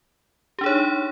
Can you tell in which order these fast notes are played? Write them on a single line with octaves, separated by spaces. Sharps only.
G4 D4 G#4 C#5 D#4